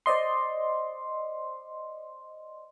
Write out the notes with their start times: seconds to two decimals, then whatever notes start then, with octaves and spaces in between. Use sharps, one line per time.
0.06 C5 D5 D#5 C6